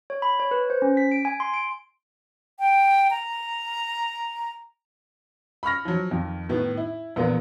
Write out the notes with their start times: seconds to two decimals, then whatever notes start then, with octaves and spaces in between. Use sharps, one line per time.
0.10 C#5
0.22 B5
0.40 C#5
0.51 B4
0.70 C5
0.82 C#4
0.97 B6
1.12 D7
1.25 G#5
1.40 C6
1.54 D7
2.59 G5
3.11 A#5
5.63 B5 C#6 F6 A#6
5.85 F3 F#3
6.10 F2 D#3
6.49 A2 D#3 B3
6.77 E4
7.16 A#1 E2 B3 F4 A#4